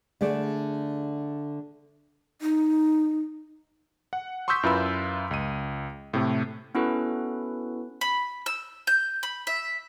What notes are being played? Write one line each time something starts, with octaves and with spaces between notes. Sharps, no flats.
D3 A3 G#4 D5
D#4
F#5
C6 C#6 D#6 E6 G6 B6
F#2 E4 F4 B4 B5 E6
C#2 D#7
A2 C3 A3
B3 C#4 E4 F#4 A4 B4
B5
E6
G6
B5
E5